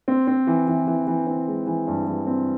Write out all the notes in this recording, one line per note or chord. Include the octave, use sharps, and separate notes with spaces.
C4
C4
E3
E3
E3
E3
C4
G#3
E3
G2
E3
C4